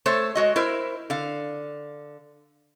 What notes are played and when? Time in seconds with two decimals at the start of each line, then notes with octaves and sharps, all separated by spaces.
0.06 A3 A4 C5 C#5
0.35 G#3 F#4 D#5
0.56 E4 A#4 C5
1.10 D3 F5